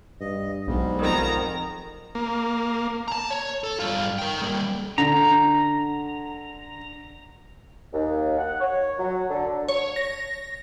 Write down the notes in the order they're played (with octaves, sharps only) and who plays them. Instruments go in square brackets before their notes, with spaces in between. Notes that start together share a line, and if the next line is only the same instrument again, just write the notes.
[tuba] G2 [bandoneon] D#5
[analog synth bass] B1 [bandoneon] G#2 G3 [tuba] G#3
[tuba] F2 [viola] D#3 A#5
[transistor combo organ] A#3
[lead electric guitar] A5 A#5
C#5
A4
G2 F4
A#4 G5
G3 A#3
[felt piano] D3 [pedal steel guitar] A#5
[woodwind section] D#2
F#5
C#5
F#3
D3
[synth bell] C#5
A#6